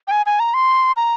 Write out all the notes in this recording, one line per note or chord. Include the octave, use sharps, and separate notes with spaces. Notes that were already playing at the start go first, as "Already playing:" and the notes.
G5
G#5
G#5
A#5
C6
A#5